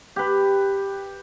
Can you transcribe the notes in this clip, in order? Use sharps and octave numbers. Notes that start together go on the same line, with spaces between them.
G4 B4